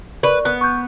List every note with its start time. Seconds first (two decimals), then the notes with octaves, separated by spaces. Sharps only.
0.23 A#4 B4 D5 C#6
0.45 B3
0.61 C#6 G6